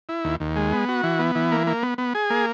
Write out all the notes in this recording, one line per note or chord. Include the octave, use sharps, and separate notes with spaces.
E4
D#2
D#2
G#3
B3
F#4
E3
B3
E3
A#3
A#3
B3
B3
G#4
A#3